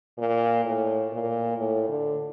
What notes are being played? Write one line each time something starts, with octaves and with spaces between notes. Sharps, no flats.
A#2
A2
A#2
A2
D3